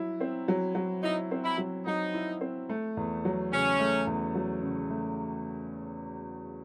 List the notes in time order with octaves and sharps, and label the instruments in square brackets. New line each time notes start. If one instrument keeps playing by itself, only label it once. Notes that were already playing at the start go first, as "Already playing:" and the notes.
Already playing: [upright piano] F#3 E4
C4
F#3
F#3
[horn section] D#4 [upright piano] E4
[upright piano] C4
[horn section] E4
[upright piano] F#3
[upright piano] F#3 [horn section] D#4
[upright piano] E4
C4
A3
E2
F#3
[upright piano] C#3 [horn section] C#4
[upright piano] A3
E2
F#3
C#3
A3